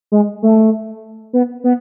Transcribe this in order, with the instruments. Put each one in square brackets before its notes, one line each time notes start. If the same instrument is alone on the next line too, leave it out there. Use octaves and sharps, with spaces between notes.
[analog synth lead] G#3
A3
B3
B3